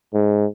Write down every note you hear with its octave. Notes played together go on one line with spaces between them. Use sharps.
G#2